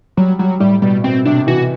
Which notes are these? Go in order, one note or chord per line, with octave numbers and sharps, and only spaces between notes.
F#3 G3
F#3 G3
A2 G3
B2 G3
B2 C4
C3 D4
E3 F#4